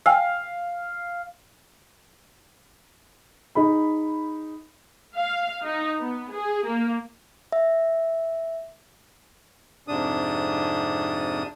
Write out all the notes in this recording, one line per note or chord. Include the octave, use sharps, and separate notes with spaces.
F5 G5 G#5 E6
D#4 G#4 B5
F5
D#4
B3
G#4
A#3
E5
F2 G#2 C3 D4 D#6